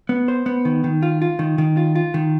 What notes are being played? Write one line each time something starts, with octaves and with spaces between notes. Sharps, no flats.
B3
C5
B3
D#3
D#3
F4
F4
D#3
D#3
F4
F4
D#3